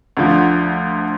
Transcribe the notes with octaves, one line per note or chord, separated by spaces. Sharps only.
D2 D3 F3